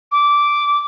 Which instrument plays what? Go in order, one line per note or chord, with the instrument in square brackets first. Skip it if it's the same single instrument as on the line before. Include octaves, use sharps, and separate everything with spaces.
[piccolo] D6